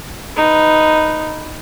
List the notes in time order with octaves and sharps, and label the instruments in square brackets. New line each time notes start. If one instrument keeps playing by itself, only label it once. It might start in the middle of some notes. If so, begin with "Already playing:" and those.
[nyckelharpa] D#4 B4